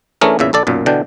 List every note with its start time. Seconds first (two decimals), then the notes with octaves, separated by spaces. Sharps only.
0.21 E3 A3 C#4 D4 G#4 A#4
0.39 E2 A#2 C#3 E5
0.53 A#1 A4 D5
0.67 B1 F#2 A#2
0.86 B2 D3 E3 D4 G5